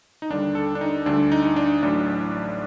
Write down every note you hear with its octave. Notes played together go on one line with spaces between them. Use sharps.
D#4
D#2 D3 G3 D4
A4
D4
D#4
D2 D3 G3 D4
D#4
D#4
D4
A1 A2 F#3 D4